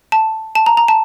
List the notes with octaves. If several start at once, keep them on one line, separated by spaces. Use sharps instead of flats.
A5
A5
A#5
A#5
A5